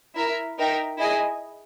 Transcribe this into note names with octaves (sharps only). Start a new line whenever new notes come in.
E4 A#4 E5
D#4 A#4 E5 G5
E4 G#4 D#5 G#5